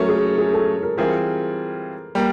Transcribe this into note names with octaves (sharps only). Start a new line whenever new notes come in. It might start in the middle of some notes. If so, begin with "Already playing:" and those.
Already playing: F#3 A3 C#4 A4 A#4
G#4
G#4
A4
A#4
E3 G3 C4 F4 G#4 A#4
G3 A#3 A#4